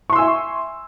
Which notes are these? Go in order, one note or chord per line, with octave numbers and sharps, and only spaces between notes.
E5 G#5 C6 C#6 E6